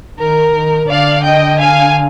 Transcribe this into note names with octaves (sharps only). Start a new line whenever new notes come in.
D#3 A#4
D#3
D3 D5 F5
D#5 G5
F5 G#5